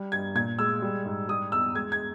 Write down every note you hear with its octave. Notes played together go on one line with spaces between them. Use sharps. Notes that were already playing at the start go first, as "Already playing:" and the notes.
Already playing: G3
G2 G#6
A#2 G#6
G#3 E6
G3
G#2
G3 D#6
E2 E6
G#3 G#6
G#6